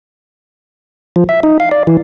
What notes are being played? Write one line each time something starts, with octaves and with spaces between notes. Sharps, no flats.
F3
E5
D#4
F5
D5
E3